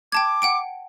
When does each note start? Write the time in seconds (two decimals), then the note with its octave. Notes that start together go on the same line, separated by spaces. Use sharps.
0.12 G5 A5 D6 G#6
0.42 F#5 G5 D7